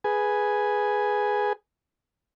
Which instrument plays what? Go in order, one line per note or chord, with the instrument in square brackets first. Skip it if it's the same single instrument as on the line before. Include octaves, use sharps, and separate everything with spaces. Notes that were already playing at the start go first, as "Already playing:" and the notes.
[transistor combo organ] G#4 B4 G#5